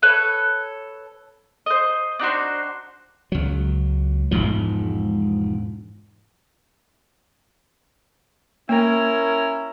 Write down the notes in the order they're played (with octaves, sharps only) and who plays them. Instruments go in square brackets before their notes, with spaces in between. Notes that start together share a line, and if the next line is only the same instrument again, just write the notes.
[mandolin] A4 B4 C#5
C5 D#5
D4 D#4 F#4 C5
[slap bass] C#2 F#3
E1 C#2 G#2 F3
[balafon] A#3 [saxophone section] C#4 E4 A#4